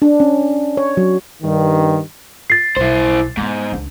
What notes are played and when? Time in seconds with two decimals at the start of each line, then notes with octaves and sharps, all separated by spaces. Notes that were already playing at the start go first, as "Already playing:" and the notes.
0.02 D4
0.20 C#4
0.77 C#5
0.97 F#3
1.42 G2 D#3
2.50 A6 C7
2.76 B1 E4 C5
3.37 G#2 A#3 B3
3.72 C#2 D4